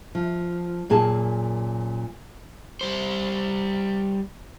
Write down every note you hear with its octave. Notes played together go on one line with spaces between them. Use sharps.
F3
F#2 A#2 G#4 A5
G3 C5